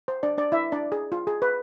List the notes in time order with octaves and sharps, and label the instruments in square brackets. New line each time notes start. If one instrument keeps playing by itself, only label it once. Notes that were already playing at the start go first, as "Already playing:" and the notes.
[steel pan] C5
D4 D5
D4 D5
E4 E5
D4 D5
G#4
F4
G#4
B4